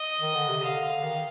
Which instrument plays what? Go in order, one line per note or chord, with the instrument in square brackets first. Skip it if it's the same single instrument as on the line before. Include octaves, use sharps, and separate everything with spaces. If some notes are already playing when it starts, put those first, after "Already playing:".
Already playing: [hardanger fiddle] D#5
[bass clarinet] D#3
D3
C3
[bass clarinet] D3 [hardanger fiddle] F5
[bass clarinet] D#3